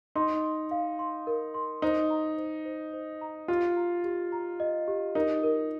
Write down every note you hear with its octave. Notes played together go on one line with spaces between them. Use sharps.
D#4 C6
C6
F5
C6
A#4
C6
D#4 C5
A#5
C5
C5
C5
A#5
F4 G4
A#5
G4
A#5
D#5
G4
D#4 A#4
A#4